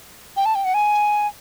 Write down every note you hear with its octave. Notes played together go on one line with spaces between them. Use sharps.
G5
A5
G5
F#5
G#5